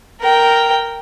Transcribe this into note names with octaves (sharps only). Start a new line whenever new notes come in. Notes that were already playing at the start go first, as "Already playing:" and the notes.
A#4 G5